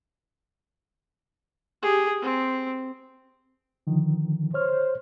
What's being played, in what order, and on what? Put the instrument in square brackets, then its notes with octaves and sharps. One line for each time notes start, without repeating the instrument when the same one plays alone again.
[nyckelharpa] G4 G#4
C4
[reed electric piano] D3 D#3 F3
[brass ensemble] C5 [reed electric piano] C#5 F6